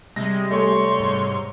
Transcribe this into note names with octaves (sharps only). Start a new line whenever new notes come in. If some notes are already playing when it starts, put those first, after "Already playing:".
C3 G3 G#3 A#6
A3 C#5 C6
G#2